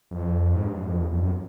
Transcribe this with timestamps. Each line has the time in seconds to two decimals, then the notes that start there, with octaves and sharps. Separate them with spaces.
0.11 F2
0.54 G#2
0.65 G2
0.77 F#2
0.88 F2
0.99 E2
1.12 F2
1.23 F#2